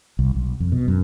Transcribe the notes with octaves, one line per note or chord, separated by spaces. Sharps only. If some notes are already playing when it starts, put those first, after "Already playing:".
C2
B1
F2
B2
F#2